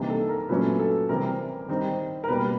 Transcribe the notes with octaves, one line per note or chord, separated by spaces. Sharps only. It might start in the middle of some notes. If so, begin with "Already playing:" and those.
Already playing: C3 E3 G3 A#3 D#4
A4
A#4
A#2 F#3 A3 C#4 B4
A4
C3 E3 G3 C4 A#4
D#3 G3 C4 D#4
A#4
B2 G3 A#3 B4